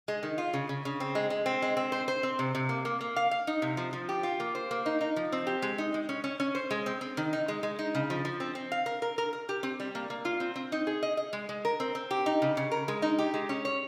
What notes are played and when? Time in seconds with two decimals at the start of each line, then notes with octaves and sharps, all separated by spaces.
0.08 G#3
0.23 D#3
0.38 F4
0.54 C#3
0.69 C#3
0.85 C#3
1.00 C4
1.15 G#3
1.30 G#3
1.46 C4
1.62 G#3
1.77 C4
1.92 C5
2.08 C5
2.23 C4
2.39 C3
2.55 C3
2.69 A#3
2.85 A#3
3.01 A#3
3.16 F5
3.31 F5
3.47 D#4
3.62 C3
3.77 F3
3.93 F3
4.09 G4
4.23 F4
4.40 A#3
4.55 C5
4.71 A#3
4.86 D#4
5.01 D#4
5.16 F3
5.32 C4
5.47 G4
5.62 G#3
5.78 D#4
5.94 G#3
6.09 C#4
6.24 C#4
6.40 C#4
6.55 C5
6.71 G#3
6.86 C4
7.01 C4
7.17 D#3
7.33 D#4
7.48 G#3
7.63 G#3
7.79 D#4
7.95 C#3
8.10 F3
8.25 F3
8.40 C4
8.55 C4
8.72 F5
8.86 A#4
9.02 A#4
9.18 A#4
9.33 A#4
9.49 G4
9.63 C4
9.80 G3
9.95 A#3
10.10 A#3
10.25 F4
10.40 C4
10.56 C4
10.72 D#4
10.87 G#4
11.03 D#5
11.17 D#5
11.33 G#3
11.49 G#3
11.65 A#4
11.80 C4
11.95 C4
12.11 G4
12.26 D#4
12.42 C#3
12.57 C#3
12.71 A#4
12.88 G#3
13.02 D#4
13.19 G4
13.34 G#3
13.49 C#4
13.65 C#5